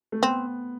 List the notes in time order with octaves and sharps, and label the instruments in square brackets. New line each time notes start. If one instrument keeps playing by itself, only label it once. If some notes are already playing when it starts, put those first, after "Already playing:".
[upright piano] A3
[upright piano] B3 [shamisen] C4